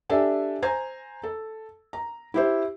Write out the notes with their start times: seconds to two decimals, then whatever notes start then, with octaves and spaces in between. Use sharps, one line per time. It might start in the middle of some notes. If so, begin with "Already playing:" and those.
0.10 D4 G4 A4 E5 G#5
0.62 C5 G#5 A#5 G#6
1.23 A4
1.93 A#5
2.34 E4 G4 C5